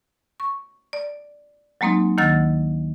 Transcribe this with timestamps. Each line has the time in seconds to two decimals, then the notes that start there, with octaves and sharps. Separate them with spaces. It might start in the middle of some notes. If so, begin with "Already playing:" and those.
0.40 C#6
0.93 D5
1.81 F#3 G#3 A#3 C4 D#4
2.18 D2 D#3 A#3 F#5 E6 A6